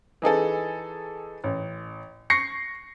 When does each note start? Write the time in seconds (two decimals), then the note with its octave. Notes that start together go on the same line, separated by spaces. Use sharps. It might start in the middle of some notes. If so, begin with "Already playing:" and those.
0.22 E3 D#4 G#4 A4
1.44 A1
2.30 C#6 A#6 C7 C#7